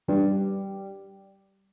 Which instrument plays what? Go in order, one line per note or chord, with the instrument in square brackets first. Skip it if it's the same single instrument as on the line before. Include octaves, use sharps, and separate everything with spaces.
[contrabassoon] G2 [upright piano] G3